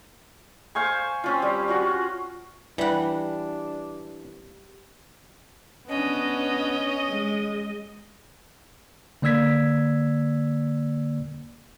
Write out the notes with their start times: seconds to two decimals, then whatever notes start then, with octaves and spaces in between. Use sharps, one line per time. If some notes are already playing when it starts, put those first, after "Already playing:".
0.75 C5 F5 G#5 C#6
1.24 C4 C#4 F4
1.42 G3
1.68 C#4 F4 F#4
2.78 E3 G3 D4 B4 F#5
5.89 B3 C#4 D4 D#5
7.10 G#3
9.22 D3 A#3 D5 E6 G#6 B6